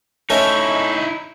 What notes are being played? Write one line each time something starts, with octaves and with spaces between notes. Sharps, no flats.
A3 C#4 D#4 E4 D#5 G#5 C#6